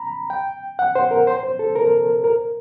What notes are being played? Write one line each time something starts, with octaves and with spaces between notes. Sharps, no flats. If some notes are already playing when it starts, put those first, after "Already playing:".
Already playing: A#5 B5
G5
F#5
C5
A#4
C5
C5
A4
A#4
A#4